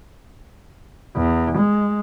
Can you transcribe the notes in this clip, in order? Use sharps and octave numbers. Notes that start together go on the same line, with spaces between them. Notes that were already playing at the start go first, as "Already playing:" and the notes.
E2
G#3